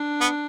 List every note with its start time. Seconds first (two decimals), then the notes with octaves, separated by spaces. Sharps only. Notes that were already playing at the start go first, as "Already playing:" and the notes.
Already playing: D4
0.21 B3